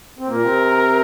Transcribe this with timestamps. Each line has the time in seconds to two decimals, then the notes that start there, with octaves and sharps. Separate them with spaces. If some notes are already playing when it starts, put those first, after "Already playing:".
0.19 C4
0.28 A#2 A#3 A#4
0.43 C3 C4